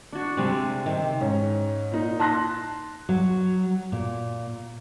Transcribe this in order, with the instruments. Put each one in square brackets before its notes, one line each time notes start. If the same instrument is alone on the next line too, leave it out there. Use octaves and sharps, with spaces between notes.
[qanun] D4 F#4
[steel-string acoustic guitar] C3 G#3 [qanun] G3 C4 D4
[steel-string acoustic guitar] C3 [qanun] D#3
[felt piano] G#2 C#4
A#2 D#4
A5 C6 F#6 A#6
[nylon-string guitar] F#3
A#2